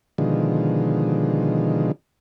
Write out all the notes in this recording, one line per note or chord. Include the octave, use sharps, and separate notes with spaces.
B2 D3 D#3 F3 G#3